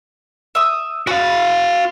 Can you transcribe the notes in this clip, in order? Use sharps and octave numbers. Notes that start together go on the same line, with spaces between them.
E5 D#6
F#4 F5 B5